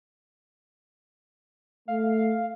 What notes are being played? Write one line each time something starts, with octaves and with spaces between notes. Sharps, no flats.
A3 F5